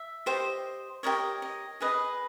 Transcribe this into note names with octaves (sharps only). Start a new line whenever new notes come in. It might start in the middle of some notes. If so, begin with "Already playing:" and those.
Already playing: E5
G4 C5 D#5
G4 A#4 C#5 D#5
D#5
G#4 B4 D#5